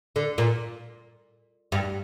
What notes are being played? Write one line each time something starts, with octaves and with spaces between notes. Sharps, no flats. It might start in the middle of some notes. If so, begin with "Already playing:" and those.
D3
A#2
G2